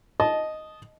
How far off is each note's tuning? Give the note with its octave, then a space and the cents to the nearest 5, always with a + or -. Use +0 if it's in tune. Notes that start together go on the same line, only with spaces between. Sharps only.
D#5 +0 A5 -20